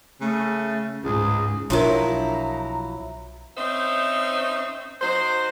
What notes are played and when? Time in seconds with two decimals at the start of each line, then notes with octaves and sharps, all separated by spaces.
0.21 C#3 A3
1.04 C#2 G#2 G#4
1.70 B1 F3 F#3 D4 E4 F4 A#4 A#5
3.57 C4 C#4 D#4 C5 E5
5.01 F#3 D#4 C5